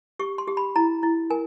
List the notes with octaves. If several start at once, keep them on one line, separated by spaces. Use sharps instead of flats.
G4 C#6
C6
G4
B5
E4 A#5
E4
A#4 G#5